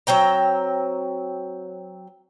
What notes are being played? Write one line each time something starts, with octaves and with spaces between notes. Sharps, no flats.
F#3 C4 G5 A#5